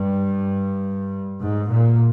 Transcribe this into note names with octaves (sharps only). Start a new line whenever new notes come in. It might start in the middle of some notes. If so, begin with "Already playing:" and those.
Already playing: G2
G#2
A#2